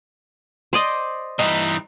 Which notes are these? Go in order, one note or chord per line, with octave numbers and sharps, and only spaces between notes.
C5 D5 D#5
G2 E3 D#4